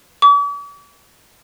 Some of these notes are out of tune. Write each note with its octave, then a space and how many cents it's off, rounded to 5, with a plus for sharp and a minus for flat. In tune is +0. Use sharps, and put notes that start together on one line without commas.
D6 -45